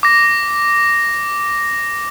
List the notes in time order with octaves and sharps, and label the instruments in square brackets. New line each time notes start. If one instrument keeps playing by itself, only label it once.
[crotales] D6 A#6